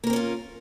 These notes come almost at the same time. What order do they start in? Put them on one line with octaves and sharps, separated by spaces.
A#3 A#4 C4 C#4 F4